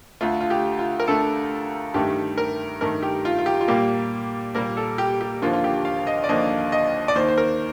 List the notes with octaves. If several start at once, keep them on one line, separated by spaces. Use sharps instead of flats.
D2 D3 A3 F4
F4
G4
F4
A#4
D2 D3 A3 A4
G2 D#3 A3 G4
A#4
G2 D#3 A3 A#4
G4
F4
F4
G4
F4
A#2 G3 A#3 G4
A#2 G3 A#3 A#4
A4
G4
G4
D#2 D3 F3 A#3 F4
F4
G4
F5
D#5
D5
D#2 D3 F3 A#3 D#5
D#5
D5
D#2 D#3 A#3 C5
C5
A#4